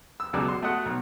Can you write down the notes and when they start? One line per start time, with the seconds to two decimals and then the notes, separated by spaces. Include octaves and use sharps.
0.20 E6
0.33 C#2 B2 F#3 D5
0.48 C6
0.62 A3 F#4 D#5 F#5
0.86 B1